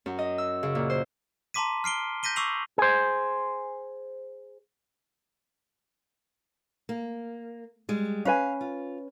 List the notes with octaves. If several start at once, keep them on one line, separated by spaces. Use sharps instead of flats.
F#2
D#5
E6
C#3
A#2
C5
A5 A#5 C6 D6 B6 D#7
F6 C7 D7 G7
G6 A#6 B6 D#7 G7
C#6 D6 E6 C7 F7 F#7
G#4 C5
A#3
G3 G#3
C#4 B4 F5 G#5
F4